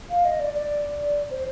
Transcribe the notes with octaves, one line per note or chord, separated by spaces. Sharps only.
F5
D#5
D5
D5
C5